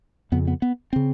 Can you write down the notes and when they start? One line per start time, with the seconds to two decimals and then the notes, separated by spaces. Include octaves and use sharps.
0.32 F2 C#3 B3
0.47 B3
0.62 B3
0.93 C#3 C4